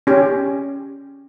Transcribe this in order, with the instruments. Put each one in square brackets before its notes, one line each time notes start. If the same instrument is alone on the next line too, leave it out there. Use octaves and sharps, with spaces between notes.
[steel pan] C#4 G4